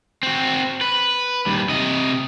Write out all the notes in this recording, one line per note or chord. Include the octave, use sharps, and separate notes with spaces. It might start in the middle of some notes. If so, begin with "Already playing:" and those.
C4 F#4
B4
D#2 G3
C3 D#5